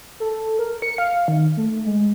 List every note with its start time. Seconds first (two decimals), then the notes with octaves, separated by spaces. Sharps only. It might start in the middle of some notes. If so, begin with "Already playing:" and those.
0.20 A4
0.59 A#4
0.82 C#7
0.98 F5
1.28 D#3
1.57 A3
1.86 G#3